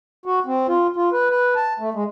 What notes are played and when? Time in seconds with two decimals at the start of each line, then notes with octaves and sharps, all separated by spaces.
0.26 F#4
0.46 C4
0.68 F4
0.96 F4
1.13 B4
1.30 B4
1.55 A5
1.80 A3
1.94 G#3